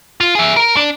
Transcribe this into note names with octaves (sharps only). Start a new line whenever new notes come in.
F4
G#4 E5
A#4
D4